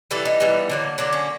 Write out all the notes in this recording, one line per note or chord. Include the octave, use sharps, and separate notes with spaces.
E3 G3 B3 A4
D#4
E3 G3 B3
D3 F#3 A#3
D3 F#3 A#3 D4
C#4